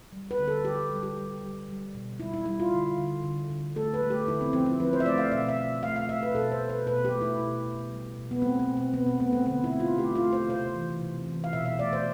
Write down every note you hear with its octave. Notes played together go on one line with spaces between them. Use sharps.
G3
B4
D3
A4
D3 G4
G3
G4
G3
G3
G3
B2
G3 E4
E4
G3 E4
F4
D3
D3
D3
D3
A3 A4
B4
A3
G4
D3 E4
C4
F3 C4
E4
F3 B4
C5
E5
A3 D5
F5
B2 E5
E5
B2
A3 F5
F5
A3 E5
B4
B2 A4
C5
B2
B4
B2 B4
G4
A3
E4
B2
B2
G3
B2
B3
A3 C4
C4
B2
C4
B2 B3
C4
A3 B3
C4
D3 B3
E4
A3
F4
A3 G4
F4
A3
C5
C3 C5
E3
C3
E3
F5
B2 E5
E5
A3 D5
C5